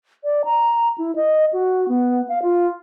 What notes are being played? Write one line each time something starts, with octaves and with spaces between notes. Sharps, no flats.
D5
A#5
E4
D#5
F#4
B3
F5
F4